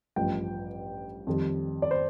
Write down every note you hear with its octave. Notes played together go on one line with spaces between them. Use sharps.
A1 G2 F3 G5
F2 D#3 G3
D5
C5